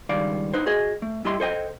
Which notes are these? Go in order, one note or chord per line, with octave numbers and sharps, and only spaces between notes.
C#2 G2 D#3 D5 F5
D#4 B4 C5
F#4 G#4 D#5
A3
G2 E4 G4 D#5 C6
A4 C5 D#5 G5